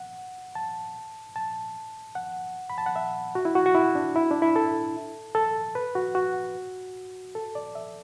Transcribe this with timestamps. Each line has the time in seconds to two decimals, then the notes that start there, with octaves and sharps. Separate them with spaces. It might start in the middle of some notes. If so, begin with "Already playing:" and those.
Already playing: F#5
0.55 A5
1.36 A5
2.15 F#5
2.70 B5
2.78 A5
2.86 F#5
2.96 E5
3.35 F#4
3.45 E4
3.55 F#4
3.66 F#4
3.75 E4
3.95 D4
4.16 E4
4.31 D4
4.42 E4
4.56 A4
5.35 A4
5.75 B4
5.95 F#4
6.15 F#4
7.35 A4
7.55 D5
7.75 E5